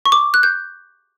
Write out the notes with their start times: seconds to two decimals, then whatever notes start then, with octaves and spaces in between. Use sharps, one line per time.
0.06 C#6
0.12 D6
0.34 F#6
0.43 G6